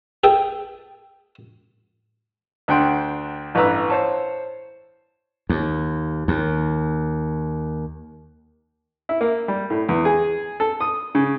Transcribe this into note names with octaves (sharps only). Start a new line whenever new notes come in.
G#4 A4 G5
D2 D4 F#5 G5 C6
A1 G2 B4 A#5 E6
C5 C#5 A5
D#2
D#2
E4
A#3
G3
A2
E2
G#4
A4
D#6
C#3